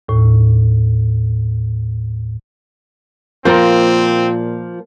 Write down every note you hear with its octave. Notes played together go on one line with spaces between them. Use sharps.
D#2 A2
A#2 F3 A#3 C4 F4 A#4 C5